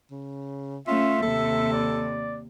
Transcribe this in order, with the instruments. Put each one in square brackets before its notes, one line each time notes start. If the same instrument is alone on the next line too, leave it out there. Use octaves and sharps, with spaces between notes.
[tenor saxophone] C#3
[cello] A3 C#4 [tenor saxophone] F4 [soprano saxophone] E5
[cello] D#2 C3 [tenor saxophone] A4
[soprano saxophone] D5